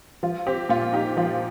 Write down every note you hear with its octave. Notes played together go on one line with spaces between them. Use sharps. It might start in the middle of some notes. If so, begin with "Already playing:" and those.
F3 F4
C4 G4
A#2 F4
D#4 G4
F3 F4